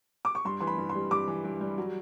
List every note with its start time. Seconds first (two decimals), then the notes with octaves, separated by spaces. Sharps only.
0.25 D6
0.35 C#6
0.45 G2 C6
0.60 E3 C6
0.67 B5
0.78 G2
0.89 C6
0.95 G3
1.11 G2 D6
1.28 E3
1.44 G2
1.61 G3
1.78 F#3